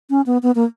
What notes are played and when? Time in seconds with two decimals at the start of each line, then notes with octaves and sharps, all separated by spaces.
0.10 C#4
0.26 B3
0.43 B3
0.55 A#3